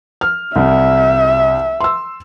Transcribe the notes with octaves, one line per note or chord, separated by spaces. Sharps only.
F6
C2 E5
C6 E6